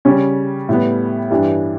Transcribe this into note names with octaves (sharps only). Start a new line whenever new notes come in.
C#3 G3 C#4
A2 G3 B3
G2 E3 G3 D4